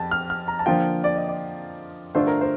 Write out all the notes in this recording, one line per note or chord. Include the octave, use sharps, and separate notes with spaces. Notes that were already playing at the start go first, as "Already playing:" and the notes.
Already playing: F2 G3 G5 A5
F6
F6
A#5
A5
D3 F3 A#3 F4 G5
D5
D#5
D5
G2 D3 A3 D4 F4 C5
A#4
C5